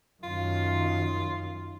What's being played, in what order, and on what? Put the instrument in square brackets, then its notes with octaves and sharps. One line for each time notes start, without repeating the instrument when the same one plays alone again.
[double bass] F#2 D#3 [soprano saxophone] F4